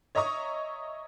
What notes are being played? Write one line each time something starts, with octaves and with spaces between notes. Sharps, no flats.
C#5 D#5 E5 A#5 C#6 D#6